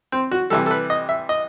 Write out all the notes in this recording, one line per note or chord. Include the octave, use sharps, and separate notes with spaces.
C4
F#4
C3 E3 G3 A4
A4
B4
D#5
E5
D#5